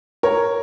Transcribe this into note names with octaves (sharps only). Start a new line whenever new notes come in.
A#4 C#5